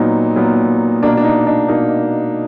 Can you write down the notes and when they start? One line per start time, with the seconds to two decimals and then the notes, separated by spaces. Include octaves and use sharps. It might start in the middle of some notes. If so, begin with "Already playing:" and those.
Already playing: A#2 F#3 B3 D#4
0.36 A#2 F#3 B3
1.02 B2 A#3 D4
1.17 D4
1.24 D#4
1.47 D4
1.68 B2 A#3 D#4